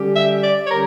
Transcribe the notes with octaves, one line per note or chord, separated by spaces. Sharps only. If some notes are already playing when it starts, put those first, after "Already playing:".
Already playing: D3 G3 C#4 G4
E5
D5
C#5
D3 G3 C#4 G4 A#4